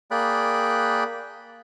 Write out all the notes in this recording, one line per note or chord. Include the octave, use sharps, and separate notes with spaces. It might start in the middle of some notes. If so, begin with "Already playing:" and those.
A#3 G#4 D5 G5 B5 F#6